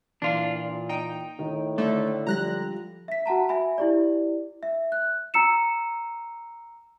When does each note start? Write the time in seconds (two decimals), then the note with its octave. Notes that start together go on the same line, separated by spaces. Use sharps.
0.22 A#2 E3 D4 F4
0.89 D#4 G5
1.39 A2 D#3
1.78 D3 A3
2.27 F3 G3 A#5 F#6 A#6
3.08 E5 B6
3.26 F#4 F#5 A5 A#5
3.49 E5 G#5 B5
3.78 E4 G4 D5
4.63 E5
4.92 F#6
5.34 A#5 E6 C#7 E7